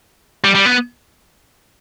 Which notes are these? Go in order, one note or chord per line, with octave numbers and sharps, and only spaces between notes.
G3
G3
B3